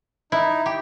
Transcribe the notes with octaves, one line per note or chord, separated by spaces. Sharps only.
D#4 E4
G4